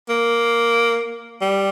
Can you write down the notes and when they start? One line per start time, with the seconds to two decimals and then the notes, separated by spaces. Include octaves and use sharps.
0.09 A#3
1.41 G3